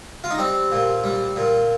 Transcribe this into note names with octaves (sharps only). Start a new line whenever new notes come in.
F4
D#4
G3 C4
A#2
G3
A#2